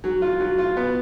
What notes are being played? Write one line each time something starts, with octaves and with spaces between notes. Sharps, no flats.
F#3
F4
F#3
F4
B3